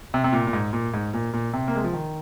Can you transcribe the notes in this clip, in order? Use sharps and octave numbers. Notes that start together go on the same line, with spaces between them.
C3
C3
A#2
A#2
G#2
A#2
G#2
A#2
A#2
C3
A#3
G#3
F3
D#3